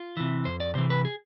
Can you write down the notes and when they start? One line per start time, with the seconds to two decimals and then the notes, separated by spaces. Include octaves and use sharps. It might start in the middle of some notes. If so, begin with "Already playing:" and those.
Already playing: F4
0.17 C3 E3
0.45 F2 C5
0.60 D5
0.75 C3 E3 C5
0.90 B4
1.05 G#4